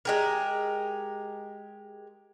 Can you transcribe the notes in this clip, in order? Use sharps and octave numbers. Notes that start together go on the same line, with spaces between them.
G#3 G4 A#4